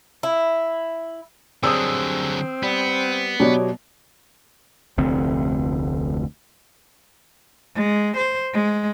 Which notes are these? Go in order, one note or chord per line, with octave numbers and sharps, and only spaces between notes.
E4
F#2 D3 F#3 G3 C4 G#4 D#6 E6
G3 B3
B2 F#3 G4 C#5 D5
F1 D2 C4
G#3
C5
G#3